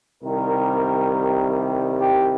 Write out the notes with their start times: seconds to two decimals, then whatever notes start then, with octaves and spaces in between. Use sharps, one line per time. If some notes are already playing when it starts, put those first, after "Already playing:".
0.23 C2 C3 D#3 G3 A#4
2.00 G4